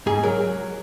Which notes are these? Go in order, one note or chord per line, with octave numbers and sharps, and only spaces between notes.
G#2 G#4
F#3 A#4
F#3